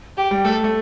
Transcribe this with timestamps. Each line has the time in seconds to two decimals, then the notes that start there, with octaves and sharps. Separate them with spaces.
0.17 G4
0.31 G3
0.45 A3 A4
0.64 A3